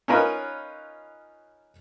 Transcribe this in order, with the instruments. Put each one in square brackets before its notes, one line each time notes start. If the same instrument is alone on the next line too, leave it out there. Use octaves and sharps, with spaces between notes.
[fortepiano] C#4 D#4 F4 A#4 B4 C#5